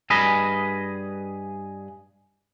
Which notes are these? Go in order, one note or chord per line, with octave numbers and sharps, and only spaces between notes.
G2 G#4 D#5 B5